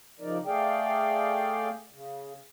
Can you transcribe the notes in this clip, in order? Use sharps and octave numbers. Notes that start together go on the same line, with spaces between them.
C#3 F3 D#4 A#4 D5
A3 G#4 D5 F5 G5
C#3